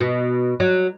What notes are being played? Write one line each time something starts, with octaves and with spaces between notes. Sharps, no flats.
B2
F#3